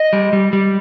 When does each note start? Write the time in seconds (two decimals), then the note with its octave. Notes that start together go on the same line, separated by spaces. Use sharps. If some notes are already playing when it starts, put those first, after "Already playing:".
Already playing: D#5
0.13 G3
0.33 G3
0.53 G3